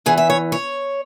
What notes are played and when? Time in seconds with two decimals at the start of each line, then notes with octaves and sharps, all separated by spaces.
0.06 E2 E3 G#4
0.17 E5
0.30 C#5
0.52 C#5